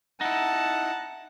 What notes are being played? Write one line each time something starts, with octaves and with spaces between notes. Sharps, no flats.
D#4 E4 F#5 A5